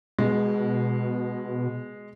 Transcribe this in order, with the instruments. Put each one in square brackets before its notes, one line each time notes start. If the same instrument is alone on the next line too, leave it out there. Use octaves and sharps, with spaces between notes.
[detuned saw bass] B2 [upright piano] G#3